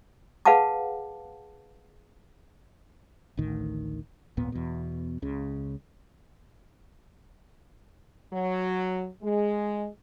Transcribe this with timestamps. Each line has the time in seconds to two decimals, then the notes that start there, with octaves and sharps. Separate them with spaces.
0.45 G#4 B4 F5 F#5 A5 D6
3.37 A1 D2 A2 D#3
4.37 G#1 D#2 A#2 B3
4.52 E2 B2
5.22 C#2 C#3
8.33 F#3
9.23 G#3